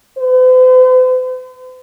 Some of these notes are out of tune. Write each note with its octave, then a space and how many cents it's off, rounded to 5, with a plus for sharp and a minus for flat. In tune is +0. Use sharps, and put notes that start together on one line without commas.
C5 -45